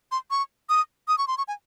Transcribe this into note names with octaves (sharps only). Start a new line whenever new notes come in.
C6
C#6
D#6
D#6
C#6
C6
C#6
G#5